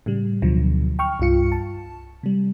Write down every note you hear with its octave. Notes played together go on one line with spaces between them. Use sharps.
A2 C#3 G3
D2 B2 D3 F3 F#3
G5 C#6 F6
C2 G2 F4 C#7
A5
C3 G3